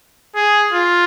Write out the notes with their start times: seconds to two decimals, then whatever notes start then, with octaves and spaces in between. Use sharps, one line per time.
0.35 G#4
0.73 F4